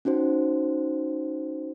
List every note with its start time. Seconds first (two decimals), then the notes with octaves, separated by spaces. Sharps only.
0.05 C#4 D#4 F#4 C5